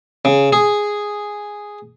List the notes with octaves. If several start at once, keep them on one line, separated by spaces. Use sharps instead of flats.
C#3
G#4